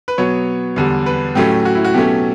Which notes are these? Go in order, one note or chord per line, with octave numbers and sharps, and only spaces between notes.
B4
B2 F#3 B3 C#5
E2 D3 G3
B4
A2 F#3 A3 C#4 G4
F#4
E4
F#4
B2 F#3 A3 C#4 G4